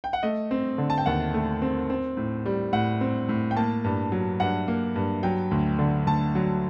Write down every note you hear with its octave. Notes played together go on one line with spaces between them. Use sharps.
G5
F#5
A3 D#5
C4
D3
A5
G5
D#2 F#5
A3
C4
C4
A2
G3
A2 F#5
C4
A2
G5
A#3 A5
G2
F#3
G2 F#5
A#3
G2
F#3 G5
D2
D3
D2 A5
F#3